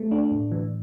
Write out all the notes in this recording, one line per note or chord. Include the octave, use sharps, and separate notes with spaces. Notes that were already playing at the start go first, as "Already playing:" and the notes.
Already playing: A3
D4
A2
E3